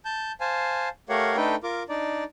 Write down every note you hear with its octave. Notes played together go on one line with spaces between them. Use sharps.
A5 G6
C5 F5 G#5 A5
A3 G4 A#4 C#5 F5 F#5
A3 D4 D#4 A4 B4 G5
F4 A#4 D6
D4 D#4 D5